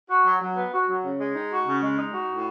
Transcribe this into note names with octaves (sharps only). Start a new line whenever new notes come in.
F#4
F#3
F#3
B3
F#4
F#3
C#3
G#3
D#4
F#4
C#3
G#3
D#4
F#4
A2